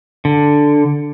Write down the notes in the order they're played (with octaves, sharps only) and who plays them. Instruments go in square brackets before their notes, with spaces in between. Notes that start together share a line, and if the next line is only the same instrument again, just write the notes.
[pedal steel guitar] D3